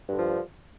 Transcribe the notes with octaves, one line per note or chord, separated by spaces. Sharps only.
G2 D3 F3